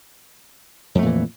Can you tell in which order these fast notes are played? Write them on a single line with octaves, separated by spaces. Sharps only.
F2 A3 A#2 E3